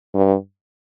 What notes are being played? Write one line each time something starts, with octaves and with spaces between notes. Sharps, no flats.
G2